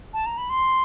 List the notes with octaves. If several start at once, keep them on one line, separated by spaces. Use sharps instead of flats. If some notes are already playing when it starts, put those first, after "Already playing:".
A5
A#5
B5
C6